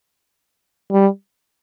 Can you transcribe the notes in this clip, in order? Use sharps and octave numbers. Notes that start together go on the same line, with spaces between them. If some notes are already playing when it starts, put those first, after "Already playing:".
G3